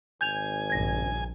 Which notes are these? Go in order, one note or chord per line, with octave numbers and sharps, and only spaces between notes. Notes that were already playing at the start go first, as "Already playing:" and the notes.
G#1 G#5 G6 G#6 F7
A#1 G2 C#3 G#6 A#6